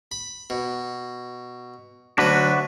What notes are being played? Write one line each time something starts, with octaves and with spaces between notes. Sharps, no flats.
B5
B2
D2 F#3 D4 F#4 B4